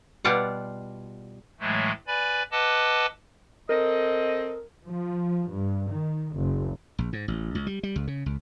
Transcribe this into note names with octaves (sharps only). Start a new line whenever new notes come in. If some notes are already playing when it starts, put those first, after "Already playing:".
B2 G3 F4 D5 F#5
A2 E3 F#3 G#3 A3
B4 D5 G#5 B5
B4 D#5 F#5 A5 D6 E6
C4 A4 A#4 D#5
F3
G2
D#3
F#1
A#1
G#2
A1
C#2
G3
G3
C#2
C#3
C#2